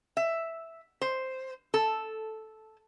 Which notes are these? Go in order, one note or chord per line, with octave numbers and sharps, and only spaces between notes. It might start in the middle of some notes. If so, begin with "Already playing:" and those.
E5
C5
A4